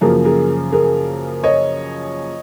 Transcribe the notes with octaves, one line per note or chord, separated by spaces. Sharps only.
F#2 C#3 F3 A#3 G#4 A#4
G#4 A#4
G#4 A#4
C#5 D#5